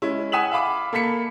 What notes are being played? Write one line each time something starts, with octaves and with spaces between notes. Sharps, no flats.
G#3 C#4 E4
F#5 G#5 D#6 B6 E7 F#7
E5 F5 B5 D6
A#3 A4 B5 B6 C#7